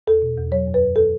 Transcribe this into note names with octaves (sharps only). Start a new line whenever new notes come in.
E2 A4
B2
E2
F#3 C#5
F#2
B4
F#2
A4